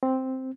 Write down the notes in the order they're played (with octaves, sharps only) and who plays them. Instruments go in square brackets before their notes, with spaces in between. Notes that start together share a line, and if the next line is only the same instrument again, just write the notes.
[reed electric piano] C4